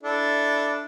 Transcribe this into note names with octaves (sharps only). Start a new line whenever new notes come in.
D4 E4 A4